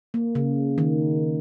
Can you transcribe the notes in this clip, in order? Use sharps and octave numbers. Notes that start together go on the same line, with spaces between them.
A#3
C#3
D#3